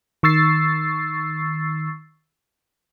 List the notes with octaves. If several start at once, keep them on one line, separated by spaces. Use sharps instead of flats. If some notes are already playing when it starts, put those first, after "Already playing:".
D#3 C#6 E6 A6 C7